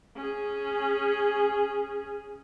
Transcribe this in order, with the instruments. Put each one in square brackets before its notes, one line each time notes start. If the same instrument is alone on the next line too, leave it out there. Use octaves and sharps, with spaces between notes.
[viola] C#4 G#4